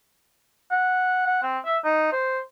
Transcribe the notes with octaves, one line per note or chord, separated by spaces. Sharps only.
F#5
F#5
C4
E5
D#4
C5